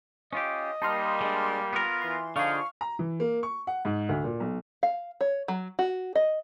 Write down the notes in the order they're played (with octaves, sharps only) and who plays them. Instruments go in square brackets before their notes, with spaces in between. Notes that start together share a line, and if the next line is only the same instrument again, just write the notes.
[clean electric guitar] C#4 F4 G4 [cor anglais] D#5
[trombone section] G3 A#3 [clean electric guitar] D#4 [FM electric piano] A5 C6 F6
[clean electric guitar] G#3 D4
[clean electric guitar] B3 A#4 [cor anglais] F4
[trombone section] E3 [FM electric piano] C6
[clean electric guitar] D3 G#4 [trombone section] F3 [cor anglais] D#4 [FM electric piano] F5 C#6 F6
[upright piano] A#5
E3
A#3
C#6
F#5
G#2
D2
A#2
B1
[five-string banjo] F5
C#5
F#3
F#4
D#5